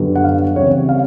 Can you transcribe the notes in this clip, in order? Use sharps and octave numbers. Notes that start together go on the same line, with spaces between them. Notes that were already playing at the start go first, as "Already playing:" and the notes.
Already playing: F#2 D3 G3 B3
F#5
F5
C#3 E3 G3 C4 C#5
F5